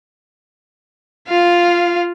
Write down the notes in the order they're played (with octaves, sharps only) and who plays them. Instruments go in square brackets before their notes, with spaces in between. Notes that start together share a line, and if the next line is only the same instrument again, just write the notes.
[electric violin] F4 F5